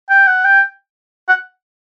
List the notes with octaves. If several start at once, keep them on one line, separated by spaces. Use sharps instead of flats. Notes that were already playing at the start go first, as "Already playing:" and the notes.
G5
F#5
G5
F#5